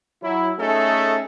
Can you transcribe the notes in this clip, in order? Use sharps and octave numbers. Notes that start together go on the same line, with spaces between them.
F#3 E4
A3 C#4 D#4 G#4 A4